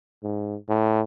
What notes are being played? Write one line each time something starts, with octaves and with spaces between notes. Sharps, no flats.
G#2
A2